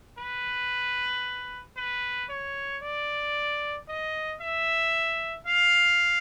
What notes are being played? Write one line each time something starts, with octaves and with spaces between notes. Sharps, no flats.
B4
B4
C#5
D5
D#5
E5
F5